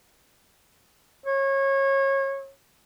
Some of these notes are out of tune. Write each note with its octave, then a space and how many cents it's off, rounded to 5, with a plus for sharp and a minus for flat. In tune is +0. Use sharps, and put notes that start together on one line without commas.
C#5 -25